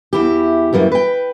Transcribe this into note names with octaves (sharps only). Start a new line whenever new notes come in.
E2 E4 G4
F#2 E3 G3 A#3
B4 G5